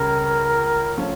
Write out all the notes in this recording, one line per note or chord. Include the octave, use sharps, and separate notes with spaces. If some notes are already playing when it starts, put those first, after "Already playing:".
Already playing: C#2 C#3 G3 A#4
F3 A3 C#4